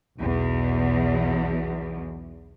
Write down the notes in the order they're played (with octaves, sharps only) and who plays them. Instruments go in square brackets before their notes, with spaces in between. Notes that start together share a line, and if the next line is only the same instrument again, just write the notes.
[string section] B1 E2 B2